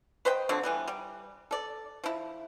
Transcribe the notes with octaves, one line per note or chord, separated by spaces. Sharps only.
B4 C5 D#5 G5
D3 F3 F#3 C4
E3 G3 B3
G3
A4 D5
F3 E4